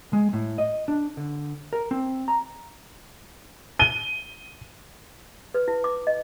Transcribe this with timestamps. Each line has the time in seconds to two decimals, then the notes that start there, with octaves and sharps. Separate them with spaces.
0.13 G#3
0.33 A2
0.58 D#5
0.88 D4
1.17 D3
1.73 A#4
1.91 C4
2.28 A#5
3.79 D#7 G7
5.54 B4
5.68 E4
5.84 D6
6.07 D#5